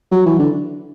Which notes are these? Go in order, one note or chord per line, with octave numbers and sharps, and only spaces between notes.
F#3
E3
D3